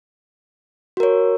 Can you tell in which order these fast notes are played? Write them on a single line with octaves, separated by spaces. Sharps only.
F#4 A#4 C#5